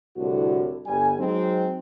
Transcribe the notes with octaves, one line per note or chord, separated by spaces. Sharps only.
C2 A2 D3 F#4
G1 G3 G#5
F#3 G#3 C4 D#4